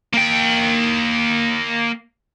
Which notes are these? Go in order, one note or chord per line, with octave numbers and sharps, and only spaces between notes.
A#3 G5